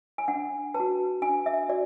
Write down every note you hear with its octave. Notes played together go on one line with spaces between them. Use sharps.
G#5
D4 F#5
B4 A5
F#4
D4 G#5
E5
F#4 D5